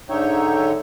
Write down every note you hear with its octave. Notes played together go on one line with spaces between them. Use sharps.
G#2 D3 D#4 C#5 E5 G5